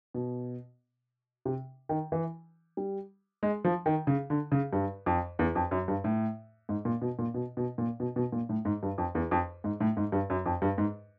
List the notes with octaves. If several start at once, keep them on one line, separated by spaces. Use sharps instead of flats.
B2
C3
D#3
E3
G3
G#3
F3
D#3
C#3
D3
C#3
G2
F2
E2
F2
F#2
G2
A2
G#2
A#2
B2
A#2
B2
B2
A#2
B2
B2
A#2
A2
G#2
G2
F2
E2
F2
G#2
A2
G#2
G2
F#2
F2
G2
G#2